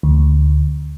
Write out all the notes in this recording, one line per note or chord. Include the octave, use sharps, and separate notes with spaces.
D2